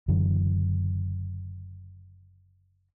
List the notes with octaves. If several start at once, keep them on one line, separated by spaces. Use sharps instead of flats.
F#1 F#2 D3 E3